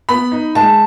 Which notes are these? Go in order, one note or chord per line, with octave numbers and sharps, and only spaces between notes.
B3 B5
D#4
G#3 A5